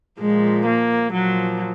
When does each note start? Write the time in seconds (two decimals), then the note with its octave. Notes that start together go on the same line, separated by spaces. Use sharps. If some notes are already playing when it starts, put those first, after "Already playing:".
0.20 A#2 F3 G#3
0.66 A#3
1.13 A#2 F3 F#3